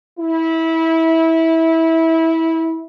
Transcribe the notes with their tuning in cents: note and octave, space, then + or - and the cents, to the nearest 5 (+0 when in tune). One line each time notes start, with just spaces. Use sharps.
E4 -20